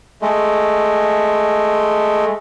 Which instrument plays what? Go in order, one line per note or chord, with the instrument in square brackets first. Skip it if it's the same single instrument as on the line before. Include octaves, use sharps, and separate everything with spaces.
[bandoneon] G#3 A3